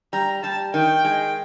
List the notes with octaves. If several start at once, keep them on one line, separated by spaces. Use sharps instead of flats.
G3 A#5
G3 A5
D#3 G5
G#3